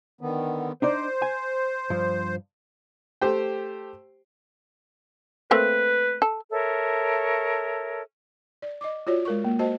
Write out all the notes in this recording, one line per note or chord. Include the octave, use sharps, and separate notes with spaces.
D3 D#3 B3
D4 D#4 C5 D5
G#5
G2 F3
A3 G4 C5 G5
A3 A#3 C4 B4
A4
A4 A#4 C#5 E5
D5
D#5 D6
F4 F#4 C#5 D5
G#3 A#4 C#6
A#3
F#4 C5 D#5 A5